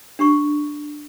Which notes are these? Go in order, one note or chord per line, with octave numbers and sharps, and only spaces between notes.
D4 G4 C#6